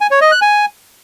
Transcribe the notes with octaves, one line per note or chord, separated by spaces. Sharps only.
G#5
C#5
D#5
F#6
G#5